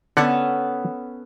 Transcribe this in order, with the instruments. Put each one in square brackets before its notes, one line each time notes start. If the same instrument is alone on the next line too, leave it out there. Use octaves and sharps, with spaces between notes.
[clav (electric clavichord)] D3 F#5 [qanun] B3 C#4 A4